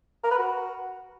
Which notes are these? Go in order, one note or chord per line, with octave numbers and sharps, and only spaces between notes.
A#4
B4
F#4